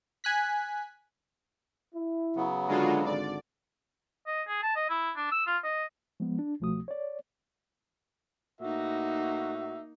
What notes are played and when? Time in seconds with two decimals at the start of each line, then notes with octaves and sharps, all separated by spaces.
0.24 G#5 F#6 B6
1.95 E4
2.36 C#3 F#3 B3
2.68 D3 G#3 D4 F4 F#4
3.05 G#1 D3 D5
4.27 D#5
4.47 G#4
4.63 A5
4.76 D#5
4.89 E4
5.16 D4
5.32 E6
5.47 F4
5.64 D#5
6.20 F3 G#3 B3
6.39 D4
6.60 C2 B2 F3 A3 F#4 D#6
6.88 C#5 D5
8.61 A2 A#3 D#4 F#4 E5